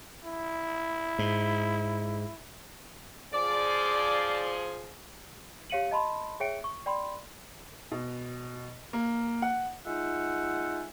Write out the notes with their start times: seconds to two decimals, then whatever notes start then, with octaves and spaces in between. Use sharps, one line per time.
0.25 E4
1.19 G#2
3.33 F3 G#4 D5
5.70 G4 C#5 F5 C#7 D#7 F#7
5.91 D#5 A5 B5 C6
6.40 G#4 C#5 E5 G5 C#7 D7
6.64 C#6
6.86 D5 G5 B5 C6
7.92 B2
8.93 A#3
9.42 F#5
9.86 G#3 D#4 F4 E5 F#5 G#5